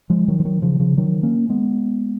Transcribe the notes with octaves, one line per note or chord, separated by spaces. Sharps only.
F3 G#3
D#3 F#3
F3
D#3 F#3
C#3 F3
C#3 F3
D#3 F#3
A#3 C#4
G#3 B3